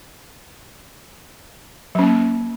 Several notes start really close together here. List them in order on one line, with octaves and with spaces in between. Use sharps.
F#3 C#4 A#3